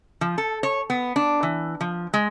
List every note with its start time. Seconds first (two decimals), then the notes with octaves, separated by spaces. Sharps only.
0.21 F3
0.38 A4
0.63 C#5
0.90 B3
1.16 D4
1.43 E3
1.81 F3
2.14 G#3